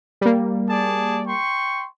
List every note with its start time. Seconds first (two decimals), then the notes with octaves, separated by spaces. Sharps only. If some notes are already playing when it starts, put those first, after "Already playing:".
0.21 G3 A#3
0.69 G#4 D5 A5
1.27 G5 C6 C#6